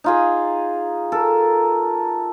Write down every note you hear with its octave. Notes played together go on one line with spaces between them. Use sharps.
D#4 F4 G#4
A4 A#4